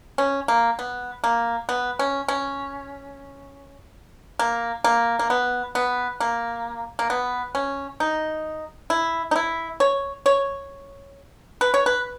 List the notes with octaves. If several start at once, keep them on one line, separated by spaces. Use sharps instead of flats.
C#4
A#3
B3
A#3
B3
C#4
C#4
A#3
A#3
A#3
B3
B3
A#3
A#3
B3
C#4
D#4
E4
D#4
E4
C#5
C#5
B4
C#5
B4